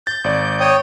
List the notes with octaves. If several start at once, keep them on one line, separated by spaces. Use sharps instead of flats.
G6 A6
G#1 D5
C#5 G5 D#6